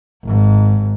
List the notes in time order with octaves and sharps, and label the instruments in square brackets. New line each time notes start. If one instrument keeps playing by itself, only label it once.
[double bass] G#1 G#2